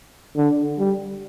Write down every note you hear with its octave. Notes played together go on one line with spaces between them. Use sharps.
D3
G3